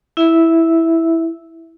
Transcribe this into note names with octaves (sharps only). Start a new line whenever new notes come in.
E4 E5